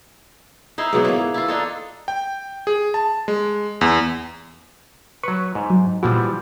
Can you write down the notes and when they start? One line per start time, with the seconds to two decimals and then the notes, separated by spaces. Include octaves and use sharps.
0.78 D#4 E4 C5
0.93 G#2 B2 F#3 B3
1.05 E3 A#3
1.34 E4 F4
1.48 D4 D#4 A4
2.08 G5
2.67 G#4
2.94 A5
3.28 G#3
3.81 E2
5.23 F#3 B4 C#6
5.55 G#2
5.70 F#3
6.03 A#2 E3 F3 G3 F#4